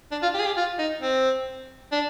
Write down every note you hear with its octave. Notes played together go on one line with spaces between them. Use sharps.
D4
F4
G4
G#4
G4
F4
D#4
C4
D4